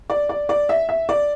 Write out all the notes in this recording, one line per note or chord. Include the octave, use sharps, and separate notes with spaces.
D5
D5
D5
E5
E5
D5